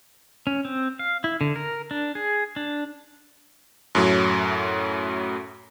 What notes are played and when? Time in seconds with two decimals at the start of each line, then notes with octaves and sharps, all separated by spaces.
0.47 C#4
0.65 C4
0.99 F5
1.24 E4
1.41 D3
1.56 A#4
1.91 D4
2.15 G#4
2.56 D4
3.95 F#2 A2 F#3